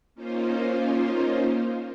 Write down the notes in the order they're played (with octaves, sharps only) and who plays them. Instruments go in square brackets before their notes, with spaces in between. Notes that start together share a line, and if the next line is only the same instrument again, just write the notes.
[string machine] A#3 C#4 D#4 F4 C5